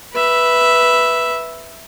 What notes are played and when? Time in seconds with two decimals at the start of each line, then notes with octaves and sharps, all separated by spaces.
0.13 B4 E5